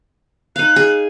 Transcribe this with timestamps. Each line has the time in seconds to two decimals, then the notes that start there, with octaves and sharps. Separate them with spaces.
0.56 D#4 F5 F#6
0.76 G#4